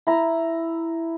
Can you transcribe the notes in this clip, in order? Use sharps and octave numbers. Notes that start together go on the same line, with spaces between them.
E4 A#5